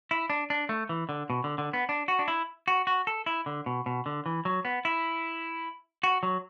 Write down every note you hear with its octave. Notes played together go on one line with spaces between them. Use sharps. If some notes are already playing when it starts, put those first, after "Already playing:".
E4
D4
D4
A3
E3
D3
B2
D3
D3
B3
D4
F#4
D4
E4
F#4
F#4
A4
E4
D3
B2
B2
D3
E3
F#3
B3
E4
F#4
F#3